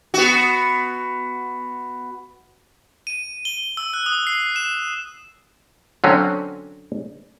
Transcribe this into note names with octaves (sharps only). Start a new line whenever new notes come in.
B3 F#4
D#7
G7
E6
F#6
D#6
C7
E7
D3 F#3 C4 C#4